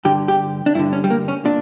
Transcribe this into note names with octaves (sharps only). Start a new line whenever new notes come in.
G2 D3 G4
G4
D4
G2 D3 E4
C#4
G3
A#3
C#4
A#2 D4